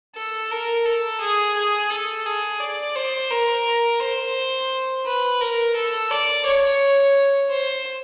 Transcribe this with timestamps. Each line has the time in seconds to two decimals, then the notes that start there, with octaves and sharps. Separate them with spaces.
0.16 A4
0.51 A#4
0.86 A4
1.21 G#4
1.56 G#4
1.90 A4
2.26 G#4
2.60 D5
2.96 C5
3.31 A#4
4.01 C5
5.06 B4
5.41 A#4
5.76 A4
6.11 D5
6.46 C#5
7.50 C5